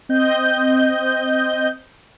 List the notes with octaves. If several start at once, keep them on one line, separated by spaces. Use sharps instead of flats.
C4 D#5 G6